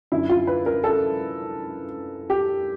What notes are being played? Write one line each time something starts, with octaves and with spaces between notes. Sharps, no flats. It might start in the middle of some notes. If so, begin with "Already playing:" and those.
F#2 D3 E4
F4
B4
A#4
A4
G4